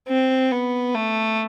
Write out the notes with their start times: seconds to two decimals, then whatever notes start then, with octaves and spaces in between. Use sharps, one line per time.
0.08 C4
0.51 B3
0.95 A3